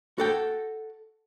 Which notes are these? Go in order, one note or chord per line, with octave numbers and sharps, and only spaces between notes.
F#4 A4 G5